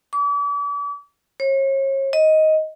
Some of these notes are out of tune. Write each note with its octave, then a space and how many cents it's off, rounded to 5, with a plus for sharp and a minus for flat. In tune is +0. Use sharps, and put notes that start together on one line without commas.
D6 -40
C#5 -40
D#5 +10